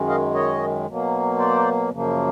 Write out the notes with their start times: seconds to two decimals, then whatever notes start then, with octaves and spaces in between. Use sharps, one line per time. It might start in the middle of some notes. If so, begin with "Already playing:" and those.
Already playing: F#2 D#3 G#3
0.08 D#5 F5
0.34 C#5 D#5
0.87 B2 F#3 A#3
1.38 C5 D5
1.90 F#2 C#3 F3 A#3